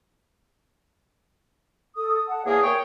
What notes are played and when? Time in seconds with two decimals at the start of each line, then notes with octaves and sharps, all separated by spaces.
1.96 A4 D#6
2.28 F#5 A5
2.45 E2 A#3 G#4 C#5
2.63 A#4 C#5 G5